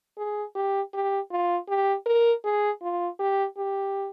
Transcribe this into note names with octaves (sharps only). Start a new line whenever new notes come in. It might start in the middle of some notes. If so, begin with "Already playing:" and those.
G#4
G4
G4
F4
G4
A#4
G#4
F4
G4
G4